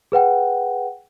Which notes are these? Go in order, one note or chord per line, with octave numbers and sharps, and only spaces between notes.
G#4 B4 F#5 G5